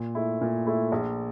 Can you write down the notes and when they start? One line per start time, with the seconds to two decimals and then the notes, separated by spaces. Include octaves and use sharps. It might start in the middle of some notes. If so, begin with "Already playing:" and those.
Already playing: A#2
0.15 A3 E4
0.41 A#2
0.67 A3 E4
0.92 A#1